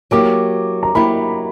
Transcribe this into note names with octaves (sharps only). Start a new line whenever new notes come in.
F#3 A#3 E4 G4 D6
A#5
F#3 A#3 E4 G4 B5